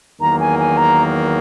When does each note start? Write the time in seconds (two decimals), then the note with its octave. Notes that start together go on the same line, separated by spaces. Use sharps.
0.20 E2 D#3 F#3 A#3 A#5
0.40 G#5
0.59 G#5
0.77 A#5